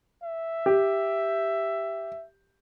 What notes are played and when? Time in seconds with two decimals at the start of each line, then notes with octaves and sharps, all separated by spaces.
0.23 E5
0.66 G4